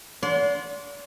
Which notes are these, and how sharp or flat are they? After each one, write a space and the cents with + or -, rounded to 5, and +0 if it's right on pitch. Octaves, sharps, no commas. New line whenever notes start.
D5 -40 F#5 -30 C6 +0